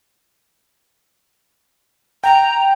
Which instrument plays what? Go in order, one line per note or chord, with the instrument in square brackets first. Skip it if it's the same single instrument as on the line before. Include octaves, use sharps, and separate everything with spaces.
[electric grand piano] G5 [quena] A#5